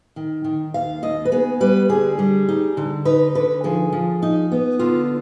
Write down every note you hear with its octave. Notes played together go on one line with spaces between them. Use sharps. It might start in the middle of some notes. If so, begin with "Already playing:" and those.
D#3
D#3
D#2 F5
D#2 D#5
B4
B3 G#4
G3 B4
D3 G#4
G3
D#4
D3
D#4 B4
D3 B4
F3 G#4
F3
D#4
B3
D3 F4